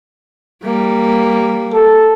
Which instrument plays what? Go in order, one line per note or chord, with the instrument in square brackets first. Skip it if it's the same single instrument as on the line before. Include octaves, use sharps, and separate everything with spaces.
[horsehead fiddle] G3 A#3
[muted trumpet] A4